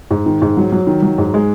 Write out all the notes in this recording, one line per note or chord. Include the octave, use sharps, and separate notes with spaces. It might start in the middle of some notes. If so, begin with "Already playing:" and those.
G#2
D#3
G#2
F#3
F#3
D#3
F#3
G#2
G#3